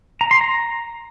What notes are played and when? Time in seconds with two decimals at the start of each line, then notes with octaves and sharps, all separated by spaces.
0.21 A#5
0.31 C6
0.41 A#5